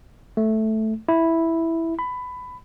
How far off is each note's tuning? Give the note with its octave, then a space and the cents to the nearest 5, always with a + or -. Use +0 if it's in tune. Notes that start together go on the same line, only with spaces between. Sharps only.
A3 -5
E4 -5
B5 +15